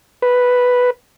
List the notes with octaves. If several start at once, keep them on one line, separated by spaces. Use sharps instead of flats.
B4